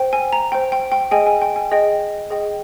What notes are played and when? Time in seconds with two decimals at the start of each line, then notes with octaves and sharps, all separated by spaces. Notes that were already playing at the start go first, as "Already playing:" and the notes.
Already playing: C5 G5
0.13 G#5
0.33 A#5
0.52 C5 G5
0.72 G5
0.92 G5
1.11 G#4 D#5 G5 G#5
1.26 G#5
1.42 G5
1.56 G#5
1.71 G#4 D#5 G5
2.31 G#4 D#5 G5